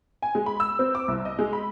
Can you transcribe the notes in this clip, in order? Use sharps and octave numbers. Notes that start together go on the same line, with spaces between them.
G#5
G#3
B5
E6
C4
D6
C2
D#5
G#3
B5